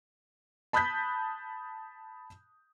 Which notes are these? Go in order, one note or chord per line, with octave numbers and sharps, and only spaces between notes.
A5 B5 D#6 F#6 G6 B6